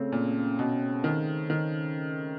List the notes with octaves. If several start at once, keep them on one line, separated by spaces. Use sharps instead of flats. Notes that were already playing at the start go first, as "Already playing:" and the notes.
Already playing: C#3 A3 C4
A#2
B2
D#3
D#3